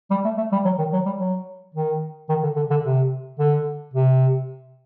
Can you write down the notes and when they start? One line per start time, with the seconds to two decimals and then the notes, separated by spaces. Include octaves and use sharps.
0.10 G3
0.25 A3
0.37 A3
0.52 G3
0.65 F#3
0.78 D#3
0.93 F#3
1.06 G3
1.19 F#3
1.74 D#3
2.29 D#3
2.43 D3
2.56 D3
2.70 D3
2.84 C3
3.39 D3
3.94 C3